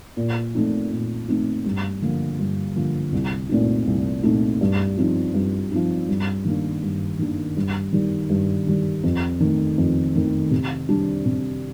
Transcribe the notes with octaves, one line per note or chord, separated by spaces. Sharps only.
A#2
A3 C4 D#4
A#2
A3 C4 D#4
G2
D3 F3 A#3
G2
D3 F3 A#3
C2
A#2 A3 C4 D#4
C2
A#2 A3 C4 D#4
G2
F3 C4 D#4
G2
F3 C4 D#4
G2
D#3 A#3 D4
G2
D#3 A#3 D4
G2
D#3 G3
G2
D#3 G3
F2
D#3 A3
F2
D#3 A3
C3
G3 D4
C3